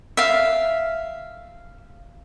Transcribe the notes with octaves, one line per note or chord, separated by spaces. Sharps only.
E5 F5